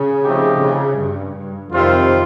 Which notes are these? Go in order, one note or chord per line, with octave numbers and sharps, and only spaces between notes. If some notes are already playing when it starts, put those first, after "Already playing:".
Already playing: C#3
F3 A3 C4 D#4 G4
C#3
G2
G2
F2 C3 D#3 G3 C4 F4